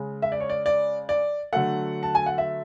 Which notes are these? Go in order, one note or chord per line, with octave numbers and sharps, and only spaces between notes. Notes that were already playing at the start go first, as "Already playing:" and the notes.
Already playing: C#3 G#3
E5
D5
C#5
D5
D5
D5
D3 F#3 A3 F#5
A5
G#5
F#5
E5